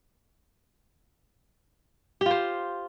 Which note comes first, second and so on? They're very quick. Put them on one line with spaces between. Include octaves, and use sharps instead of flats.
G4 F4 C5